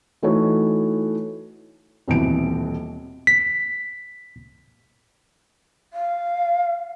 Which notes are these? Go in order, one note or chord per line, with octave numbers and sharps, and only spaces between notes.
E3 A3 D#4 F#4 C#5
D#1 B1 C3 E3 D7
B6
F5